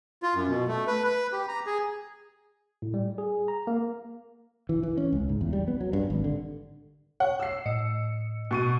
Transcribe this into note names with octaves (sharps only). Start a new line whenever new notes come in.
F4
F#2
B2
A3
B4
B4
G4
A#5
G#4
A2
G3
G#4
A#5
A#3
E3
E3
C#4
C#2
G#2
E2
G3
B3
F#3
G2
G#1
D3
C#5 F#5
E6 C7
A2 D#5 C#7
B2 C#6 D#7